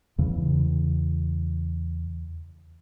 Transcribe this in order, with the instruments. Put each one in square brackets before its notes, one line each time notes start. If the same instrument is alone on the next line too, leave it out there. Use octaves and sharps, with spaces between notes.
[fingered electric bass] E2 C#3 E3